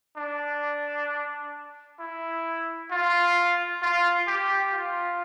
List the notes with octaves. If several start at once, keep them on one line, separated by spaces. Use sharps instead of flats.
D4
E4
F4
F4
G4
F4